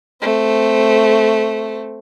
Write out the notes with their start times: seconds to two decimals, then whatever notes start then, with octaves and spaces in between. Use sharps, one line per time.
0.22 A3 C4